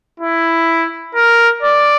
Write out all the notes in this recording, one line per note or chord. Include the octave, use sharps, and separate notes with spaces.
E4
A#4
D5